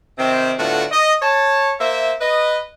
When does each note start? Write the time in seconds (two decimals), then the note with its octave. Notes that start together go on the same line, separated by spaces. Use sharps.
0.18 C3 D#3 C4
0.58 A2 D3 B3 F4 F#4
0.91 D#5
1.22 C#5 A5
1.80 A#3 C5 E5
2.20 B4 D#5